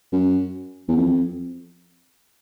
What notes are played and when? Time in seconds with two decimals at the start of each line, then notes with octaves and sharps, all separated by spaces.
0.12 F#2
0.88 E2
0.97 F2